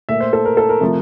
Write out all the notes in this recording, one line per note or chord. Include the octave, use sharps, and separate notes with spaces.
A#2 A3 E5
C5
A4
A#4
A4
A#4
C3 F3 A3